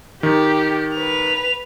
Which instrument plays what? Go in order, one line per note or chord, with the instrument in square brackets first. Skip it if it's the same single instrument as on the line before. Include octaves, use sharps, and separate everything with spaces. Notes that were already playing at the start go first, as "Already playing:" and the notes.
[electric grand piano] D#3 [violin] G4
[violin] B4 F7